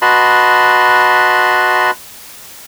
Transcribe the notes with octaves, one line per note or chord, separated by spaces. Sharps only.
F#4 B4 D#5 A5 B5 C6